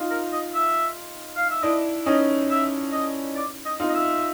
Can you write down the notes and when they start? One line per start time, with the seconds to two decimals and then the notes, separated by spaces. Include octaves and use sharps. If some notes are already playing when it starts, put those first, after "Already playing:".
Already playing: D#4 F4
0.10 A#4
0.33 D#5
0.54 E5
1.36 F5
1.50 E5
1.62 D4 E4 D#5
2.06 C#4 D#4 D#5
2.50 E5
2.92 D#5
3.36 D5
3.65 D#5
3.80 D#4 F4
3.89 D#5
3.95 E5